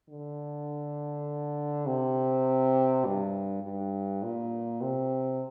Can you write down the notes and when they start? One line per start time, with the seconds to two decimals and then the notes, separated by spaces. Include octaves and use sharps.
0.09 D3
1.86 C3
3.05 G2
3.63 G2
4.23 A#2
4.81 C3